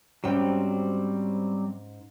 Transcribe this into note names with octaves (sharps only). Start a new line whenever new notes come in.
G#2 F#3 G3 C4 C#4 G5